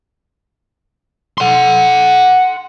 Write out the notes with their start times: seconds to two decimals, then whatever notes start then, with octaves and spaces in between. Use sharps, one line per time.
1.38 F#5 C6